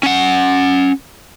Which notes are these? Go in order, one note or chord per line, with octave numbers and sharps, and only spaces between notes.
C#4 F#5